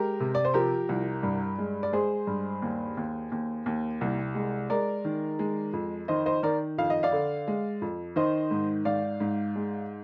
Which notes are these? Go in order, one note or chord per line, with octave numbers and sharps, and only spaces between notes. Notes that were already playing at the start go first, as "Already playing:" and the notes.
Already playing: G#3 G4 A#4
C3
D5
C5
F3 G4 A#4
C2
G2
G#3
D5
G#3 G#4 C5
G2
D#2
D#2
D#2
D#2
C2
G#3
G#3 A#4 D5
D#3
G#3
F2
D#3 C5 D#5
C5 D#5
D#3 A#4 D5
F2 F5
D#5
D5 F5
D3
G#3
F2
D#3 C5 D#5
G#2
G#2 D5 F5
G#2
G#3